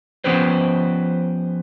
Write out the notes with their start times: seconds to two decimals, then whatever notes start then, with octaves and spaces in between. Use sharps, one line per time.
0.24 F3 B3 C#4 G4 B4 C5